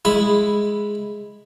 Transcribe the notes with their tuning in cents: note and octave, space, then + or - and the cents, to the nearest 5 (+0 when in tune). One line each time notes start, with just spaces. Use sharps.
G#3 +0 E4 +5 B5 +0